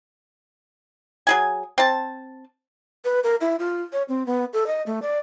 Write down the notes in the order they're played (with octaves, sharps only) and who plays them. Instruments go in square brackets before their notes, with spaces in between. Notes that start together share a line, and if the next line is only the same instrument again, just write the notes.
[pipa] F#3 G#4 G#5
C4 A5
[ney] B4
A#4
E4
F4
C#5
C4
B3
A4
D#5
A3
D5